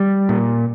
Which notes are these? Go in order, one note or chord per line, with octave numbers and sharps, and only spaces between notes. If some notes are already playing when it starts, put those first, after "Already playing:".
Already playing: G3
A#2